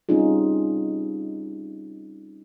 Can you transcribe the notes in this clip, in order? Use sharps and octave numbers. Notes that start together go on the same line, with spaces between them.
G3 C4 C#4 D#4 F4 G#4